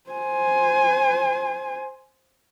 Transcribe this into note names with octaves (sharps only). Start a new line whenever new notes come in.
C5 G#5